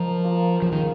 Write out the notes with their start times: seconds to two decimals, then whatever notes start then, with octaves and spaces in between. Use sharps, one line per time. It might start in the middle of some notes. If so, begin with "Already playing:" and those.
Already playing: F3 A#4 D#5
0.24 A#3 F4 A#4 D#5
0.62 F3 A#3 C#4 G#4
0.72 D#3